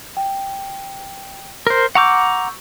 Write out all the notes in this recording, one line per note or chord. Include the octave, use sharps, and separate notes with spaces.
G5
A#4 C5
F#5 A#5 C#6 D6 E6 G6